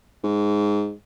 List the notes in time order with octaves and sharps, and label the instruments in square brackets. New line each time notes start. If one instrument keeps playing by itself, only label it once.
[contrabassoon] G#2